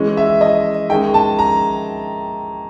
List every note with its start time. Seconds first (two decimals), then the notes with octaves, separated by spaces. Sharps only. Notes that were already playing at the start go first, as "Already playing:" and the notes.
Already playing: E3 G#3 C#4
0.17 E5
0.41 D#5
0.90 D#3 G#3 C#4 G5
1.14 A5
1.39 A#5